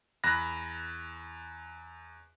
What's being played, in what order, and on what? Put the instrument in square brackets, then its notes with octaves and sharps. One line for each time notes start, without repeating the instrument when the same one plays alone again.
[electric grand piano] E2 B5 F#6 A#6